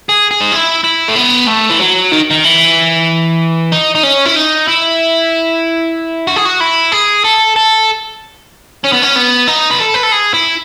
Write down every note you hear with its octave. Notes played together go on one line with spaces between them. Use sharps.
G#4
G#4
D#4
E4
E4
A3
B3
A3
E3
F#3
D#3
D#3
E3
D#4
D#4
C#4
E4
D#4
E4
F#4
G#4
F#4
E4
G#4
A4
A4
C#4
B3
C#4
B3
D#4
B4
A4
B4
A4
G#4
E4